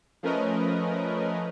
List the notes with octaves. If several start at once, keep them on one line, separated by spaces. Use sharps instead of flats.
F3 A3 C#4 A#4 B4 D#5